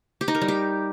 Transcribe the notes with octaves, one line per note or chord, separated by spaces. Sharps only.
G4
D#4
A#4
G3
G4